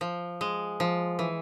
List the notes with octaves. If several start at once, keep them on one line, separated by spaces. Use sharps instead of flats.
F3
G#3
F3
E3